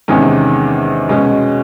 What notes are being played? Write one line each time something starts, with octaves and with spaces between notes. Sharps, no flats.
E2 C3 D#3 G#3 C#4
B2 G#3 C#4